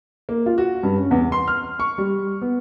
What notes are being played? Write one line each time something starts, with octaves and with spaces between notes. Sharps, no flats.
A#3
F4
F#4
G2
C#4
E2
C6
F6
C#6
G3
B3